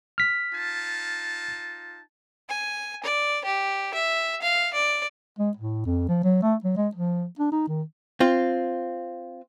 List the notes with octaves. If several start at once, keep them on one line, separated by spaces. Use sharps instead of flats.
F6 B6
D#4 F4 A5
G#5
D5
G4
E5
F5
D5
G#3
A2
F2
F3
F#3
A3
F#3
G#3
F3
D4
D#4
D#3
C4 F4